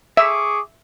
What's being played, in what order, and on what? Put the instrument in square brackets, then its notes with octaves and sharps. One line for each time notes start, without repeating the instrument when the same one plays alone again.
[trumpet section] G#4 C#6 D6 [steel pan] E5